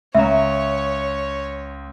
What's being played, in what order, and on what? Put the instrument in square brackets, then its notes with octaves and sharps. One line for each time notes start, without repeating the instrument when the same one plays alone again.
[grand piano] C#2 [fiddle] C#5 [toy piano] E5 A#5